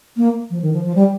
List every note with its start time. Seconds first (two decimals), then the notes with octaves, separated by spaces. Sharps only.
0.17 A#3
0.50 F3
0.62 D#3
0.73 F3
0.85 F3
0.95 G3